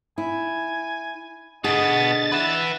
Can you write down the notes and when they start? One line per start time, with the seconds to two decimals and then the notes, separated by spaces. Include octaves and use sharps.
0.18 E4 G#5
1.64 B2 D3 B3 G#4 D#5 A6
2.32 B4 E5 F#5